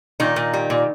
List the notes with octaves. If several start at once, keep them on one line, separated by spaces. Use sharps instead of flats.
A#2 D#3 D#4
A#2
G3
A#2